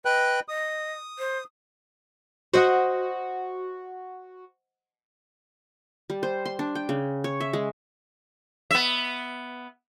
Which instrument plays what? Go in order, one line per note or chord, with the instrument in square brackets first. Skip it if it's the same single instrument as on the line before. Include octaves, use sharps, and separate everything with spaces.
[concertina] B4 G5 F#6 [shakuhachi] D#5
[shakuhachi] D#5 [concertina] D#6
[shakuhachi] C5
[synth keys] F#4 [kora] C5 D#5 F#5
[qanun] G3
C5
C6
D4
G5
C#3
C#5
E5
G#3
[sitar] B3 E5